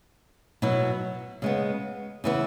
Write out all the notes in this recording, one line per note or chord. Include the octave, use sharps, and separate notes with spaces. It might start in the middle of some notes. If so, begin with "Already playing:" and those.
B2 F#3 B3 E4
C#3 G#3 B3
C#3 E3 B3 E4